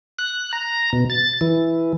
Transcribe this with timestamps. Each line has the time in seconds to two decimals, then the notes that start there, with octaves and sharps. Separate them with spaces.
0.19 F#6
0.53 A#5
0.93 B2
1.10 A6
1.41 E3